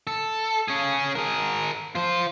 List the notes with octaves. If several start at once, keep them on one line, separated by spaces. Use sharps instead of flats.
A4
C#4 G#4
G#4 A#4
F4 C5